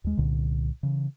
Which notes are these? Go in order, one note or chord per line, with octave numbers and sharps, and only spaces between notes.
D#2 G#3
C2 A#2 D3
C#3 E3